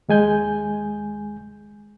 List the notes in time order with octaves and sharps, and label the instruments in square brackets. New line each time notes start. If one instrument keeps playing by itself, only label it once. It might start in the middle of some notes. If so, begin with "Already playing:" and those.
[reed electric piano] D#2 G#3 G#5 G6